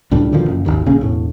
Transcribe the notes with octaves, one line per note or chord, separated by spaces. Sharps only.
C#2 A2 G3 D4
B2 D3 D#3 F3
F#1
G#1 D#2
A#1 C#3 A#3 C#4
E1 A2